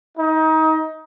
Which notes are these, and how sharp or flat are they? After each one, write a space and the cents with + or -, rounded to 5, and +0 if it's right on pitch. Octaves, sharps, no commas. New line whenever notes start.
D#4 +25